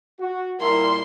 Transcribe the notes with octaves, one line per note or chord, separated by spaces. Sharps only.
F#4
A#2 G3 E4 A#4 C6